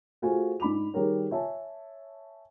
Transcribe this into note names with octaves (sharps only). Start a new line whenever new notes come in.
A3 F4 F#4 G#4 C5 G#5
G#2 D4 B5 D6 F7
D#3 G3 G4 G#4 A#4 C#5
C#5 E5 G#5 A5